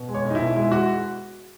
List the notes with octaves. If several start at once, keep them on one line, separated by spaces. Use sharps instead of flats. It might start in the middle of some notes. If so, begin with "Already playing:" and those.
Already playing: B2
G#3
C#5
B1
D#4
B2 E4
G#3 E4
G#3 F#4